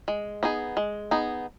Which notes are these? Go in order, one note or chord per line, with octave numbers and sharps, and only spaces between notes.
G#3
B3 D#4 G#4
G#3
B3 D#4 G#4